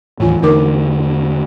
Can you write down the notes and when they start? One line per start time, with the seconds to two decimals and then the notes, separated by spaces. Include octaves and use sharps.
0.20 D#2 A2 E3 F4 G#5
0.42 E2 D3 A3 D#4 A#4 D6